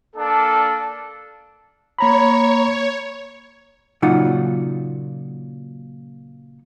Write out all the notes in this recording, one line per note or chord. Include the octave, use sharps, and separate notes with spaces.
A#3 D4 A4
A#3 C#5 A#5 B5
A#2 C#3 F#3 D#4 F4 F#5